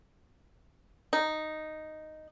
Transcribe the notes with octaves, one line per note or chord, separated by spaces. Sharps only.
D#4